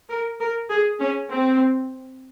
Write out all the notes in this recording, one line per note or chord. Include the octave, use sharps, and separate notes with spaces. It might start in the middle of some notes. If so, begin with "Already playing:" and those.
A#4
A#4
G#4
C#4
C4